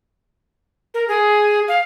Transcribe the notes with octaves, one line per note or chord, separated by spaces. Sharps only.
A#4
G#4
F5